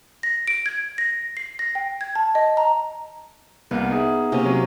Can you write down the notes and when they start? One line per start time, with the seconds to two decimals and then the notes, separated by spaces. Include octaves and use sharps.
0.23 A#6
0.47 D7
0.66 G#6
0.98 A#6
1.37 C7
1.59 A#6
1.75 G5
2.01 G#6
2.15 A5
2.35 D#5
2.57 A#5
3.71 C2 A#3 B3 A#4
3.91 D#4 G#4 E5
4.32 C3 A#3 C#4
4.46 F#3